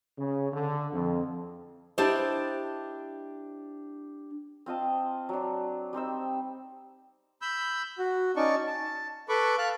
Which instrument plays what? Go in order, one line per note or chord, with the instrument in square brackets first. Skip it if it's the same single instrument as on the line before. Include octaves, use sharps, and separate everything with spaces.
[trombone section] C#3
D3
F2
[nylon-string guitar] D4 E4 G4 C5 D#5
[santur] C4 F4 D#5 A5
F#3 D4
G3 C4 D#4 E6
[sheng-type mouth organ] B5 E6 G6
F#4
C#4 D#4 D5 A5 C#6
A5
A4 B4 B5 C#6 D6
F5 A5 F#6